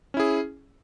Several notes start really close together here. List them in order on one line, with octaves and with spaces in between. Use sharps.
C#4 E4 G#4